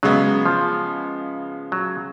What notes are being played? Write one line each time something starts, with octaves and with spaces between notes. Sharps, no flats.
C#3 F#3 G#3 B3
F3
F#3